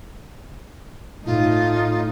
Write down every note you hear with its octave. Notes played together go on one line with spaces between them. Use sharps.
A2 D#4 F4